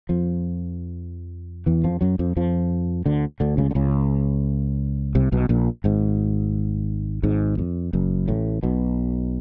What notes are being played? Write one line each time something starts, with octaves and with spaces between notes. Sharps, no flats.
F2 F3
E2 E3
F2 F3
F#2 F#3
F2 F3
F2 F3
D2 D3
D2 D3
C#2 C#3
D3
C#2 C#3
C2 C3
B1 B2
A#1 A#2
G#1 G#2
G#1 G#2
F2
F#1 F#2
A1 A2
B1 B2